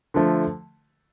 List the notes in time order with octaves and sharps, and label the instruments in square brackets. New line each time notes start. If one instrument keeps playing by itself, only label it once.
[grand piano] D3 F3 A3